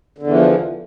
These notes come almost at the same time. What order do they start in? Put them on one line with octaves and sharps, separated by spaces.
D3 E2 E3 F3